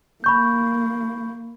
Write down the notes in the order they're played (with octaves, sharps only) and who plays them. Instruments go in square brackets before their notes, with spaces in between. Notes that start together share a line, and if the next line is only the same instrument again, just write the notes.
[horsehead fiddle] A#3 [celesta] B5 C#6 G6